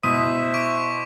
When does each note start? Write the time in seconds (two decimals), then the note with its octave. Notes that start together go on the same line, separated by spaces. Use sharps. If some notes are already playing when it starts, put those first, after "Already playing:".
0.03 B2 E4 C5 E5 D#6 B6 D#7
0.54 C#6 D6 D7